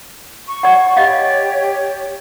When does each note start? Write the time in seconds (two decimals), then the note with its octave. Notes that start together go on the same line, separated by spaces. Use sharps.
0.48 C#6
0.63 D5 F#5
0.97 G4 C#5 D#5 F5